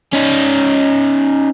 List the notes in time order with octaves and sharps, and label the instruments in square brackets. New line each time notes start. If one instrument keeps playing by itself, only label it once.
[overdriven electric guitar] C#4 D#4